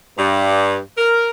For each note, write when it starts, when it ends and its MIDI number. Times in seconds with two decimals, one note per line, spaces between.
0.17 0.77 43
0.98 1.30 70